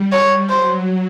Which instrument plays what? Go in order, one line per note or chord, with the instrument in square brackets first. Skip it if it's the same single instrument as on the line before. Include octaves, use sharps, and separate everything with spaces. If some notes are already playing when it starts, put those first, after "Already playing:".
Already playing: [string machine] G3
[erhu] C#5
[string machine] F#3 [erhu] C5